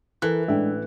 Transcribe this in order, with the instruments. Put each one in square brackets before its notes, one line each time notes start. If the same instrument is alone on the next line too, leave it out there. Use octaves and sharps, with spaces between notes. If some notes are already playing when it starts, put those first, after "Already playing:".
[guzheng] E3 [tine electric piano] E4 A4 A#4 [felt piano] F#6
[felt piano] A1 A4 G5 [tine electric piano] G#3 [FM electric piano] D4 E5